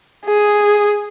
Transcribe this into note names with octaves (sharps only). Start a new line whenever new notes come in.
G#4